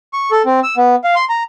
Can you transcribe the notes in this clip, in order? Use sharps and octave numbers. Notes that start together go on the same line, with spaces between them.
C#6
A4
C4
E6
B3
F5
C6
A#5